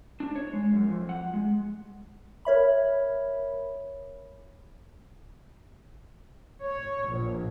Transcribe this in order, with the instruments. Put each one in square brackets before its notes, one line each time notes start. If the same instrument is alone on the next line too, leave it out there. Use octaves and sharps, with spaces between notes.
[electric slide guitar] D4
C#5
G#3
F#2
F2
F#5
G#3
[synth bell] A#4 C#5 E5 B5
[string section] C#5
A#1